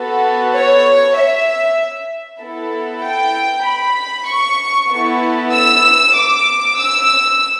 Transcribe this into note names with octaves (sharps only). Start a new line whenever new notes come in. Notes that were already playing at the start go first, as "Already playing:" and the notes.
Already playing: B3 F#4 A4
C#5
E5
B3 E4 A4
G5
B5
C#6
B3 E4 A4
E6
D6
E6